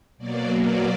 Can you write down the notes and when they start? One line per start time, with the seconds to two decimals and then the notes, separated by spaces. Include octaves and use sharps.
0.18 B2 F#3 A#3 D5
0.61 D5